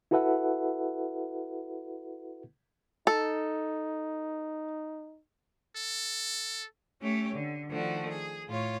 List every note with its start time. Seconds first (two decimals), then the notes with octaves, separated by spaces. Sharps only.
0.11 E4 F#4 A4 B4 E5 F#5
3.07 D#4 A4
5.76 A4
7.03 A3 C#4 G4 C#5
7.35 D3
7.71 D#3 F3 A3 D4 F#4
8.08 G#4
8.48 A2 F4 C#5